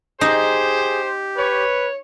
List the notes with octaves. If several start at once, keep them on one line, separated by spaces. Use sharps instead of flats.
D#4 G4 G#4 C5
B4 C#5